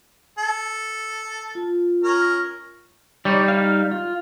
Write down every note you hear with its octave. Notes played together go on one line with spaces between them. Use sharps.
A4
F4
C#4 A#4
G3 D#4 C#5 D5
D#4 F5
F4